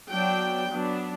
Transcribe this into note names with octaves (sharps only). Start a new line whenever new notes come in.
F#3 B3 D4 G5
F#3 B3 D4